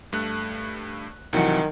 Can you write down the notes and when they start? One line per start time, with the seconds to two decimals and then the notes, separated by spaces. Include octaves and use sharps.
0.13 G2 A3 F#6
1.33 C2 C3 D#3 E3 F#3 F#5